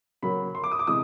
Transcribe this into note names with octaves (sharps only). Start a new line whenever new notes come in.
C#3 F#3 A#3 B5
C6
D6
D#6
D6
C3 E3 G#3 D#6